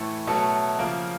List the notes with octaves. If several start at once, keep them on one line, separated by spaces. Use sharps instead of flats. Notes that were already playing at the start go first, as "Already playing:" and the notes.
Already playing: A2 E3 A3 A4
B2 F#3 A3 A4
C#3 F3 A#3 A#4